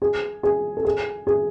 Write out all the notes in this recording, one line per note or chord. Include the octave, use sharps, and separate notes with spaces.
G#4
G#4
A4
G#4
G#4